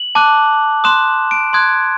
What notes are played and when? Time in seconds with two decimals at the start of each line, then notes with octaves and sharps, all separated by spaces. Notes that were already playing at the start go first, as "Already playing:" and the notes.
Already playing: F#7
0.15 A5 D6 F#6
0.84 C6 D#6 F#6 E7
1.31 D7
1.53 C6 D#6 F#6 G#6